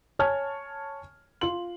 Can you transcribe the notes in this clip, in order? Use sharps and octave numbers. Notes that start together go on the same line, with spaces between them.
C#5 G#5 A5 C#6 F6 G#6
F4 C6 F#7